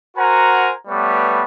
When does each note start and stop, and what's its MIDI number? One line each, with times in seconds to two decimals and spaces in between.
0.17 0.71 66
0.17 0.71 70
0.17 0.71 72
0.17 0.71 78
0.17 0.71 80
0.17 0.71 82
0.88 1.44 55
0.88 1.44 57
0.88 1.44 59
0.88 1.44 71
0.88 1.44 73
0.88 1.44 86